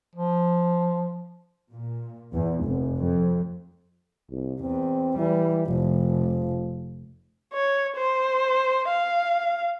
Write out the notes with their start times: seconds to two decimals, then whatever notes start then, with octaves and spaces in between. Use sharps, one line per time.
0.15 F3
1.72 A#2
2.33 E2
2.64 F1
2.97 F2
4.30 C2
4.61 E2 C4
5.18 E3 G3
5.67 F1 F3
7.53 C#5
7.96 C5
8.89 F5